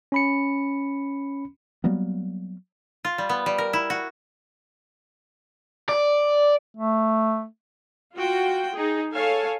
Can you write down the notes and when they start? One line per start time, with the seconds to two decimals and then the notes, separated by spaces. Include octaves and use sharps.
0.12 C#4 B5 C#7
1.84 F#3 G3 A#3 B3
3.05 F4
3.18 G3
3.29 B3
3.46 G3
3.58 A#4
3.73 E4
3.90 F#4
5.89 D5
6.77 A3
8.16 F4 F#4 G5
8.76 D#4 G#4
9.14 A4 C#5 F5 G#5 A5